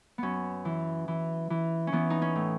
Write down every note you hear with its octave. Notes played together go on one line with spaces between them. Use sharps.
F#2 B3 C#4
E3
E3
E3
C#4
E3 B3
D#4
C#4
A2